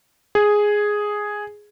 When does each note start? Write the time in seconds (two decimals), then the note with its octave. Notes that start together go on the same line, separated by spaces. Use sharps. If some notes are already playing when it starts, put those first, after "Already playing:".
0.35 G#4